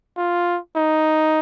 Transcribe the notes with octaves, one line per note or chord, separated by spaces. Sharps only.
F4
D#4